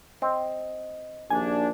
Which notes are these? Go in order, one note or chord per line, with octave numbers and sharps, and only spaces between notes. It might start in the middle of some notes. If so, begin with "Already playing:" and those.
C4 D#5
A#1 D#2 D4 G#5